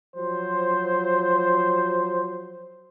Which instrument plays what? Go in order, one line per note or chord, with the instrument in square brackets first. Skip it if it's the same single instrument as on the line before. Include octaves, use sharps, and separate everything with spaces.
[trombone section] F3 F#3 C5